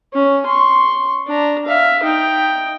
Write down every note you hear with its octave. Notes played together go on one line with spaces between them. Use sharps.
C#4
C6 C#6
D4 A#5
E5 F5
D#4 G5